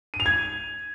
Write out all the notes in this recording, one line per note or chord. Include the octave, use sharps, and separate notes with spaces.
D#7
F7
G#6